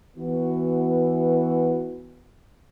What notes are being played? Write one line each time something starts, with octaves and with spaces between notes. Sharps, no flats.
E3 B3 F#4